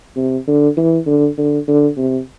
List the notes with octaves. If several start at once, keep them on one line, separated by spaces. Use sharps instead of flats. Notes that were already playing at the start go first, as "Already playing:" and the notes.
C3
D3
E3
D3
D3
D3
C3